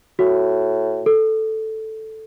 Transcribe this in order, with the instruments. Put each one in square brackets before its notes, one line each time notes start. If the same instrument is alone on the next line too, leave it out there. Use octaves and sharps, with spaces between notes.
[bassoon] A2 [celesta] F#4
[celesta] A4